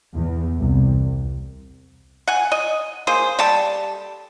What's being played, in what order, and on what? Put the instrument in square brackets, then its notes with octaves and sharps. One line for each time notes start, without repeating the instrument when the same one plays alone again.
[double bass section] E2
C2
[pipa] F#5 G#5
D#5
A#3 G#4 C5
G3 G4 A4 A5